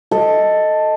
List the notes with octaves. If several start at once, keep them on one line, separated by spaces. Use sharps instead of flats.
A4 D#5